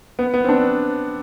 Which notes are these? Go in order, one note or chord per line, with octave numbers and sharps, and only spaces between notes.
B3
B3
C4
D4